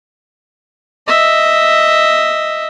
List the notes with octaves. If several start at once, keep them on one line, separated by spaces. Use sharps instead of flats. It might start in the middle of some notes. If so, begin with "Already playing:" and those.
D#5 E5